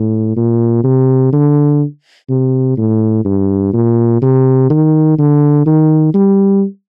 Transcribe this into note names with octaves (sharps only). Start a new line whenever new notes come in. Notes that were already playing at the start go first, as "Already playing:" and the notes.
Already playing: A2
A#2
C3
D3
C3
A2
G2
A#2
C3
D#3
D3
D#3
G3